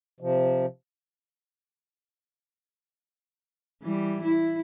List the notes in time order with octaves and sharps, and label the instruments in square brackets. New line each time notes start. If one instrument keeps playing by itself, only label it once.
[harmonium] C3 F3
[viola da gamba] E3 G3
E4